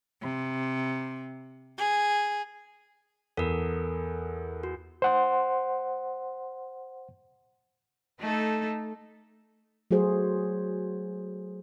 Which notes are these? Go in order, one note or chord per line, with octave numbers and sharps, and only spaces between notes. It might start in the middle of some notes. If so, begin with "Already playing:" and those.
C3
G#4
E2 A4 A#4
F#4
C5 F#5 C6
A3 D#4 A4
F#3 A3 F#4 G#4 C5